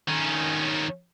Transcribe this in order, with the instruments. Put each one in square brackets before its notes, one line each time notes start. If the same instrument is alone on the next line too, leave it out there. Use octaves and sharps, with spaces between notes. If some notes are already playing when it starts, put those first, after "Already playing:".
[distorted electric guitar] D#3 C#4